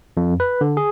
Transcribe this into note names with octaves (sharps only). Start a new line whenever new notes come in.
F2
B4
D3
G#4